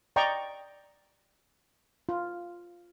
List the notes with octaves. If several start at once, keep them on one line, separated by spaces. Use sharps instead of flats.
D5 D#5 G5 A#5 C#6
F4